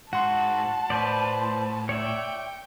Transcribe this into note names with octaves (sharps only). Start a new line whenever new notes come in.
G#2 F#4 F#5 A5 C6
A2 B4 C5 D5
C#5 D5 E5 G5